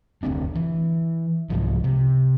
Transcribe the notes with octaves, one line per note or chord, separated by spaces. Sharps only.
F1 D2 C4 D4
E3
C2 G#2 F3
C3